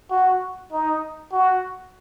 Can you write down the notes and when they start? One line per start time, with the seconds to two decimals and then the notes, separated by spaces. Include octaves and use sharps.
0.11 F#4
0.72 D#4
1.32 F#4